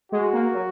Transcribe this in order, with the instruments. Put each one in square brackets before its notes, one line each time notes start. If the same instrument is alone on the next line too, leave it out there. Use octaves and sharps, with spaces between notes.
[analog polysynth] G#3 [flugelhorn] F#4
[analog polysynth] A#3
F#3